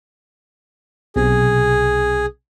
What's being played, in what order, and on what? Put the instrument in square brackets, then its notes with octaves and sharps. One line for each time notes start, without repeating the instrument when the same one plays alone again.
[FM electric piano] B1 C3 [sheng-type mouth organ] G#4